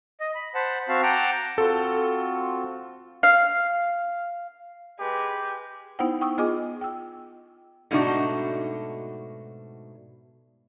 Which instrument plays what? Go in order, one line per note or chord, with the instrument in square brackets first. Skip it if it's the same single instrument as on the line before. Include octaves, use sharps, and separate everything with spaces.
[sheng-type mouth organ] D#5
B5
C5 F#5 A5 B5
C4 F#4 F5 A5
F#5 G5 A5 A#5 D6
[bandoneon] C4 F4 F#4 [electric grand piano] A4
[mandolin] F5
[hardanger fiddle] G#3 B4 [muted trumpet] G4
[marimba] B3 D#4 E4 C5 F#5 G5
G5 C#6 D#6 E6
B3 F4 G#4 D#5 G#5 D6
G5 E6
[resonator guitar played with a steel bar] G#2 B2 A3 D4 D#4 F#4